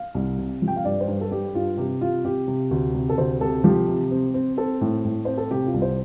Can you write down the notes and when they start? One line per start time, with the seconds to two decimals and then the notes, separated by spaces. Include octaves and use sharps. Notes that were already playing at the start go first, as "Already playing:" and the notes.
Already playing: F5
0.15 C2
0.38 C3
0.62 F3
0.68 G5
0.76 F5
0.85 G2 D5
1.01 C5
1.08 G2
1.21 A4
1.31 G3 G4
1.55 G2 F4
1.77 C3 G4
2.01 C3 F4
2.25 C3 G4
2.48 C3
2.71 D2
2.94 C3
3.10 A4
3.18 D2 C5
3.41 C3 A4
3.64 F3 G4
3.88 C3
4.11 C4
4.34 C4
4.57 C4 A4
4.81 A2
5.05 A2
5.25 C4 C5
5.38 A4
5.51 C3 G4
5.67 F4
5.74 C2
5.82 C5